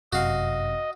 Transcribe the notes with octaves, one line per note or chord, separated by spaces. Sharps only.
G1 F#2 C3 F#4 D#5 F5